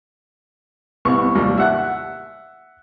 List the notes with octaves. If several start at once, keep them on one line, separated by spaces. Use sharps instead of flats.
C2 B3 C#6
D#2 G3
E5 F#5 F#6